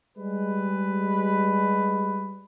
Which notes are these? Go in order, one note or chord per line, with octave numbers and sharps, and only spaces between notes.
G3 G#3 B4